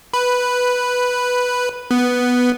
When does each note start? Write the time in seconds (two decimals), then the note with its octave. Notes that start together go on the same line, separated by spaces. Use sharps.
0.13 B4
1.91 B3